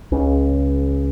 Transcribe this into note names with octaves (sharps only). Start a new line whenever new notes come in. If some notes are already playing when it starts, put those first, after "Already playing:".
C#2 C#3